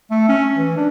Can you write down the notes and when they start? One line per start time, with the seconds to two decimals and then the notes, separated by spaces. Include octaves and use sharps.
0.11 A3
0.29 C#4
0.56 E3
0.77 D4